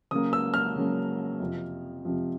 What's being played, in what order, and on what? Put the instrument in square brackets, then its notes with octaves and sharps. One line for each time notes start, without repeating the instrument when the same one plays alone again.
[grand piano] C#3 F#3 A#3 D#6
E6
F6
C#3 F#3 A#3
F2 C3 F3
F2 C3 F3